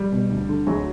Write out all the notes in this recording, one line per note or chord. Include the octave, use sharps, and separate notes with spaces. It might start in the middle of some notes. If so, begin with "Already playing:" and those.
Already playing: G3
B2
D2
D3
D2 F#3 G#3